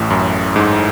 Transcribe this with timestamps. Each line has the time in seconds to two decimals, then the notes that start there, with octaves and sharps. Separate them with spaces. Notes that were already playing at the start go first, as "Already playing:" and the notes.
Already playing: A1 A2
0.10 F#2
0.56 G#2